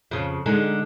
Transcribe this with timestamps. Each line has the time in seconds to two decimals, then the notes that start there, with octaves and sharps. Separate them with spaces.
0.11 F2 C#3
0.46 D3 G#3 D#4